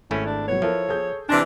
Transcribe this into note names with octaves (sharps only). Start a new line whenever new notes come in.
G#1 A3 C#4 E4
D4
F#3 B3 C#5
F3 E4 A4 A#4
G#4 A4 G6
C3 E3 D4 G#5 C6 A#6